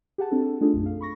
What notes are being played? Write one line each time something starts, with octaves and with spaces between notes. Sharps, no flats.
G4 G#4 F#5 A5
C4 D4 A4
A3 D4 D#4 F4 G#4 A4
B1 F#2
F5
B5 C#6 A#6